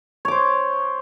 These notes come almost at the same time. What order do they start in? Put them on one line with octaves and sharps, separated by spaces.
C#5 D6 C5